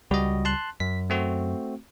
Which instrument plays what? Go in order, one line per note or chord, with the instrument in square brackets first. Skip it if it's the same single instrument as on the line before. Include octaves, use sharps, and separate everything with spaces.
[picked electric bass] C#2 G3 [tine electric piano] F#4 D#5
[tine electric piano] A5 C6 F#6
[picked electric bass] F#2 [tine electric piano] B6
[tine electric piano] A3 C4 F#4